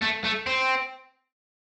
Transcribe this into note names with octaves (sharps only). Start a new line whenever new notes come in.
A3
A3
C4